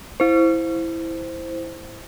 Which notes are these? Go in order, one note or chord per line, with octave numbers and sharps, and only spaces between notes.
E4 C5